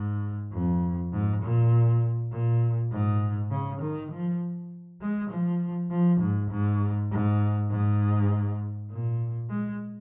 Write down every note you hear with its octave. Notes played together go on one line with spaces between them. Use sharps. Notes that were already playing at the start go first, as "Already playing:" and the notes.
Already playing: G#2
F2
G#2
A#2
A#2
G#2
C#3
D#3
F3
G#3
F3
F3
G#2
G#2
G#2
G#2
A#2
G#3